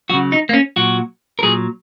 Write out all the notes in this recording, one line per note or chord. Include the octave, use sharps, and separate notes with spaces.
C#3 F#3 F#4
D#4
A#3
C#4
A#2 F#3 F#4
A#4
A#2 F#3 G#4